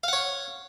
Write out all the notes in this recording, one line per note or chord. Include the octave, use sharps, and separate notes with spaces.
C#5 F5 F#5